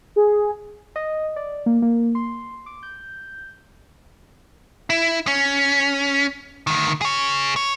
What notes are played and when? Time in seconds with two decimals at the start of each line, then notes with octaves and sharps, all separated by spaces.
0.16 G#4
0.96 D#5
1.36 D5
1.66 A#3
1.82 A#3
2.15 C6
2.66 D6
2.83 G6
4.90 E4
5.27 C#4
6.67 D2 D#3
7.01 G#4 C#5
7.56 C#5